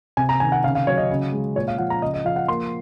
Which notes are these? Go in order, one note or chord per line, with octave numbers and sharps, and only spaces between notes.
C3 G#5
A#5
D#3 G#5
F#5
C#3 F5
F5
F#3 C#5
D#5
C#3
G#3
A#2 C#5
F5
F3 F#5
A#5
C#3 D#5
D#5
F3 F5
F#5
A#3 C6